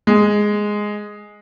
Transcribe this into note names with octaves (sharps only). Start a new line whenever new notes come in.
G#3